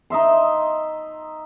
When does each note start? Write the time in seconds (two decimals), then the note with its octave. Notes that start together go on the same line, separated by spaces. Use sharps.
0.10 D#4 D#5 E5 C6